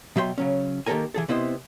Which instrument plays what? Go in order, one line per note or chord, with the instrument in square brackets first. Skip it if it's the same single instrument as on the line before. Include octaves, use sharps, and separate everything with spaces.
[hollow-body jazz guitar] B2 F#3 E5 G5 C6
C#3 F#3 C#4
D#3 A#3 G4 A4 A#4 G#5
E3 G#4 A4
C3 B3 E4 C5 D#5